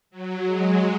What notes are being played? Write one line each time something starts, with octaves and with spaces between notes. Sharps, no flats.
F#3
G#3